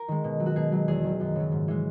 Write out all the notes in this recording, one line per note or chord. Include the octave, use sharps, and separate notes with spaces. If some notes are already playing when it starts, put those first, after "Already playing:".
Already playing: A#4
D#3 G#3
B2
F#3
F#4
B2 G#4
F#3
E2 G#4
D#3 F#3
F#2
C#3 F#3
G#2
E3 G#3